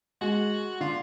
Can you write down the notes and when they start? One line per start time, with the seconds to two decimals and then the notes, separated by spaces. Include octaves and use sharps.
0.21 G#3 F#4
0.80 D3 F4